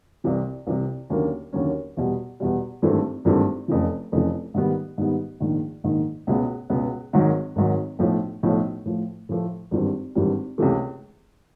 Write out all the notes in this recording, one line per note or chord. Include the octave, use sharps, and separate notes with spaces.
C2 C3 E3
C2 C3 E3
D#2 D3 F#3 A#3 C#4
D#2 D3 F#3 A#3 C#4
E2 B2 G3
E2 B2 G3
G#1 G2 E3 A3 C4
G#1 G2 E3 A3 C4
F1 F2 C#3 E3
F1 F2 C#3 E3
G#2 D#3 G3 B3
G#2 D#3 G3 B3
A#1 G#2 D#3
A#1 G#2 D#3
C#2 B2 G#3 B3
C#2 B2 G#3 B3
G#1 G#2 D#3 F#3
G#1 G#2 D#3 F#3
B1 A2 F3
B1 A2 F3
A2 F3 A3
A2 F3 A3
G#1 G2 E3 G3 C4
G#1 G2 E3 G3 C4
C#2 C3 E3 A3